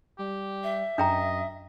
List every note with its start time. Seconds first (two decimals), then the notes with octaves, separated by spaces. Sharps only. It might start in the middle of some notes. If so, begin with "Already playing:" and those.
0.19 G3 G4
0.63 E5
0.98 F#2 D4 D#5 G5 A#5